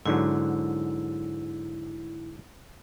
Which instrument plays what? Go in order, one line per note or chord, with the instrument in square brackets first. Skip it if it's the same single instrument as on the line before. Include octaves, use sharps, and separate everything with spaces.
[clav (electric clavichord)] G#2 D3 F#3 [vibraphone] E4